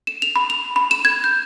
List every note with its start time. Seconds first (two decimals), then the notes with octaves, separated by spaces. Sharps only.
0.07 E7
0.22 F7
0.36 B5
0.50 F7
0.76 B5
0.91 E7
1.05 G#6
1.24 G6